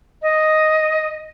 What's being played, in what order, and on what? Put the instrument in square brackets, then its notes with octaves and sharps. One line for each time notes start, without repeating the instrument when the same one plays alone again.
[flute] D#5